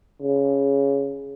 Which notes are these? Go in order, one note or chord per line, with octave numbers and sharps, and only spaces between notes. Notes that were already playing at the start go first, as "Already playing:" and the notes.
C#3